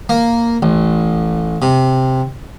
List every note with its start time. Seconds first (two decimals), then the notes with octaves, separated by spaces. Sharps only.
0.09 A#3
0.63 A1
1.62 C3